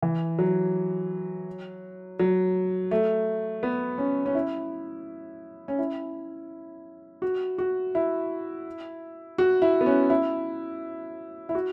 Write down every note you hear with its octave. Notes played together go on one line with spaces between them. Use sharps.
E3
F#3
F#3
A3
B3
C#4
C#4
E4
C#4
E4
F#4
F#4
E4
F#4
E4
B3
C#4
E4
E4
F#4